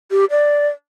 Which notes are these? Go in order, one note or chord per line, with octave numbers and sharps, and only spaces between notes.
G4
D5